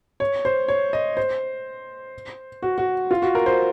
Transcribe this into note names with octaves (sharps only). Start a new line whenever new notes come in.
C#5
C5
C#5
D#5
C5
F#4
F#4
F4
F#4
A#4
C5